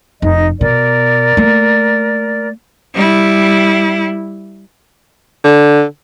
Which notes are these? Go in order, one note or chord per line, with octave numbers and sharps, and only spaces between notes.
F1 D#4 D#5
B2 A#4 D5
A3 A#3
G3 E4
D3